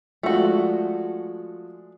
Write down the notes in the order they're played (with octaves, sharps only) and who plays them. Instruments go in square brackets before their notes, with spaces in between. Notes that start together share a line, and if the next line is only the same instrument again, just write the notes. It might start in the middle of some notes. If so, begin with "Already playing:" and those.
[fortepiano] F3 G#3 D4 [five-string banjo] A3 F#4